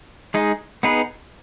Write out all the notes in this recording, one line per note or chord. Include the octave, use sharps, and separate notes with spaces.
G#3 D#4 G#4
B3 D#4 G#4 B4